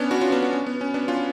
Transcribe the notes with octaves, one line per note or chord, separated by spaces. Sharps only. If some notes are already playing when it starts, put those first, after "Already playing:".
Already playing: B3 C#4 D4
D4 F#4
C#4 F4
B3 D4
B3
C#4
B3
C#4
B3 D4
C#4 F4